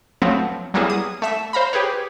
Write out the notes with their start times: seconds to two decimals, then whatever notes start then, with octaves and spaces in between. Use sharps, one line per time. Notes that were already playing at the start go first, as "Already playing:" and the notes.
0.22 F3 F#3 A3 B3 C4
0.74 F#3 G3 A#3 B3 E4 G#4
0.90 D#6
1.22 A3 E5 B6
1.53 C5 F5 A#5 B5
1.73 G4 G#4 B4 C#5